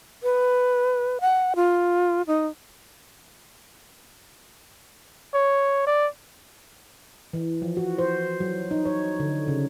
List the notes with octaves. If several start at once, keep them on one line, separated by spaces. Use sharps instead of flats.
B4
F#5
F4
D#4
C#5
D5
E3
F3
F#4
C5
F#3
D#4
C#5
D3
C#3